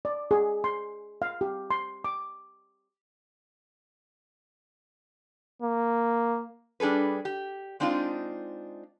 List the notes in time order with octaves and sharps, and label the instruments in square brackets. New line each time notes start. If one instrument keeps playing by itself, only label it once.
[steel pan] D5
G#4
C6
F5
G4
C6
D6
[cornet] A#3
[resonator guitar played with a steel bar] G3 D4 G#4 A4 B4
G4
G#3 C4 D4 D#4 F4